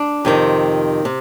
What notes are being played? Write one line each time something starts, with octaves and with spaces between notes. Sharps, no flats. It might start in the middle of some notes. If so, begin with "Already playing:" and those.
Already playing: D4
F2 C3 D#3
C3